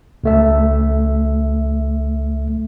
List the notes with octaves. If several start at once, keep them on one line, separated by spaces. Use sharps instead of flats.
C#2 A3 E5